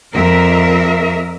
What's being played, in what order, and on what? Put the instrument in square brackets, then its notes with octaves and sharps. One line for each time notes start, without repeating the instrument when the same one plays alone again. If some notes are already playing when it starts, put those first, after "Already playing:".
[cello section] F2 A#4 E5